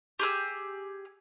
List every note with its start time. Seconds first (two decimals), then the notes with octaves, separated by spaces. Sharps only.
0.19 G4 G#4 E6